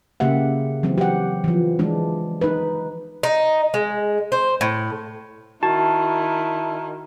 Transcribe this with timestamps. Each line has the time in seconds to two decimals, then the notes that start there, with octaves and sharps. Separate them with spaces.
0.20 C#3 A#3 G4 E5 F#5
0.83 E3 F#3 C4
0.98 G4 F#5
1.44 E3 F3
1.79 E3 G#3 D4
2.41 D#4 B4
3.23 D#4
3.74 G#3
4.32 C5
4.61 A2
5.63 D#3 E4 F#4 A5